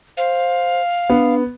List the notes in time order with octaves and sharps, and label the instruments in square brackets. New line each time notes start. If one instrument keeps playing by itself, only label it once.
[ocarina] C5 [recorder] F5
[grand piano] B3 [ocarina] D4